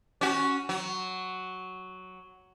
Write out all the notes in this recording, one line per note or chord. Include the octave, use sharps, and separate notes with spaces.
C#4 F#4
F#3